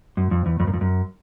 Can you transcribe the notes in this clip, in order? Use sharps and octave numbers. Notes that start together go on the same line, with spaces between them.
F#2
F2
E2
F2
F#2
F2
F#2